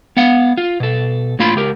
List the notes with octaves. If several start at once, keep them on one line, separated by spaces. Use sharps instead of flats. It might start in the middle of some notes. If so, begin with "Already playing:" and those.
B3 F5 F#5
F4
B2 A4
A2 A#3 F4 B5 C6
C#2 G4 A#4